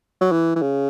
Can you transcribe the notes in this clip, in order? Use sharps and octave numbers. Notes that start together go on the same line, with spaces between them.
F#3
E3
E3
C#3